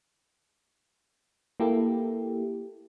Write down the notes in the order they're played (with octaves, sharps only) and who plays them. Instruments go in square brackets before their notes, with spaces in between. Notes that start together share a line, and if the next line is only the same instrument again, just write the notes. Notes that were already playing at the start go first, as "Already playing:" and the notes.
[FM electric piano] A#3 E4 G4 A4